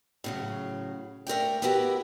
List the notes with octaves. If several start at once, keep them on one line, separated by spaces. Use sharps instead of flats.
A2 C#3 F#3
A3 A#4 D5 G5
B3 E4 F#4 G4 A#4